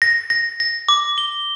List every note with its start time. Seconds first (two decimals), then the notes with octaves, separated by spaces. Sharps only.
0.02 A#6
0.30 A#6
0.60 A#6
0.89 D6
1.18 G7